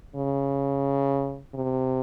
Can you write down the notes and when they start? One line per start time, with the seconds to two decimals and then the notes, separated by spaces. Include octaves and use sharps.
0.16 C#3
1.54 C3